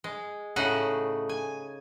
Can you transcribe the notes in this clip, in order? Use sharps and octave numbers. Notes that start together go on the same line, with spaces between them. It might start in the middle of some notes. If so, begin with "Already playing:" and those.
G#3
A2 C#3 D#4 F#5
G#5